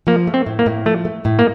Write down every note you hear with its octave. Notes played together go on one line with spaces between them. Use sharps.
F3 A#3
A3
C4
A2
A#3
A2
F3 A3
A3
A2
A#3